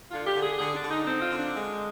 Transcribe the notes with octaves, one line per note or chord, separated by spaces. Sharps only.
D3 F4
G4
D3
G#4
D3 G#4
D4
D3
D#4
C4 D#4
F4
D3
D4
G#3